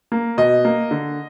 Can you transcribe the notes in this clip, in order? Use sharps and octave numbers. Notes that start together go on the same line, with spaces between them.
A#3
B2 D#5
A#3
D3